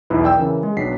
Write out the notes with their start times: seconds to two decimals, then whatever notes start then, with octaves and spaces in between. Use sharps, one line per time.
0.10 B1 E2 E4 B4
0.24 D5 G5 E6
0.37 C#3 E3 A#4
0.63 G#3
0.77 B1 F#3 B3 D4 B6 C7